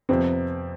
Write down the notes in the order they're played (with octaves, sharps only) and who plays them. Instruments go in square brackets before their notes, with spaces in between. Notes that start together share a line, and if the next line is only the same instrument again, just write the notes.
[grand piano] F2 C3 F3 B3 [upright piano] C4